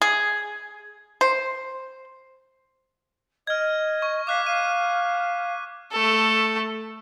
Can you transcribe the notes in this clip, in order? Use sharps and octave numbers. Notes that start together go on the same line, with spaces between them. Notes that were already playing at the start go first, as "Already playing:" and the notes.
G#4
C5
D#5 F6 G#6
C#6
F5 D6 F#6 B6
F5 D#7
A3 A4